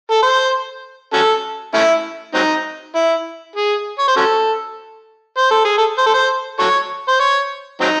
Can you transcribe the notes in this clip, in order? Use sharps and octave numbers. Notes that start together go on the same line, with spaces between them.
A4
C5
C#4 F#4 A4
A3 C#4 E4
F#3 C4 D#4
E4
G#4
C#5
C5
C#4 F#4 A4
C5
A4
G#4
A4
C5
A4
C5
F#4 A4 C#5
C5
C#5
F#3 C4 D#4